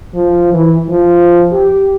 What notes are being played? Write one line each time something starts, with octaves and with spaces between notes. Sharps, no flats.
F3
E3
F3
G4